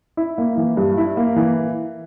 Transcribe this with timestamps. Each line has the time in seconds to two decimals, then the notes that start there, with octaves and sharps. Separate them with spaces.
0.17 E4
0.38 A#3
0.57 E3
0.77 G2
0.98 E4
1.17 A#3
1.36 E3